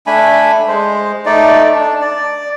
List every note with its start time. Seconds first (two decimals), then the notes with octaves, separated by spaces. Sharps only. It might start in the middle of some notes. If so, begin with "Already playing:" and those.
0.07 A3 D4 G#5 B5
0.68 G#3 C5
1.26 A3 D#4 D5
1.76 D4
2.01 D5